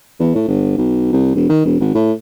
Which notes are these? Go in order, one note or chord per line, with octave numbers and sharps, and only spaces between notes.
E2
A2
G1
B1
C2
E1
D#3
E1
G#1
A2